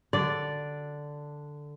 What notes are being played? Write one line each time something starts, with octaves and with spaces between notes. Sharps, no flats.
D3 D5